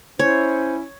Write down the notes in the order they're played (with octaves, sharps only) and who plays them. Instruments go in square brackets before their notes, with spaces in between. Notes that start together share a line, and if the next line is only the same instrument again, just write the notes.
[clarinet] C#4 [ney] E4 [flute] C5 [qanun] C#5